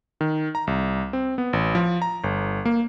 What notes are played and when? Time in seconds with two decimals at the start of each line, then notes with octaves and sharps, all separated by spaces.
0.21 D#3
0.55 A#5
0.67 C2
1.13 C4
1.38 B3
1.53 A1
1.75 F3
2.02 A#5
2.24 G1
2.65 A#3